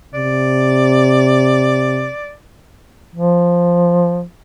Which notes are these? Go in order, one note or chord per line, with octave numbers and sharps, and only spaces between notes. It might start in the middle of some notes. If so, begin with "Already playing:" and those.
C3 D5
F3